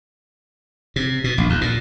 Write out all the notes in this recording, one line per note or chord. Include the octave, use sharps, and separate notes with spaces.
C3
B2
A#1
D#2
A#2